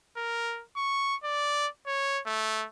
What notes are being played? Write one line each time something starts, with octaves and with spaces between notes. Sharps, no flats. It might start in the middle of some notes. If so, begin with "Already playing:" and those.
A#4
C#6
D5
C#5
A3